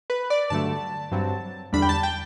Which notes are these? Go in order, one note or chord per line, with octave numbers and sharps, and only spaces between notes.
B4
D5
G2 D3 F#3 A3 A5
G2 F#3 C4
E2 D3 G3 D4 B5
G5
A5
G5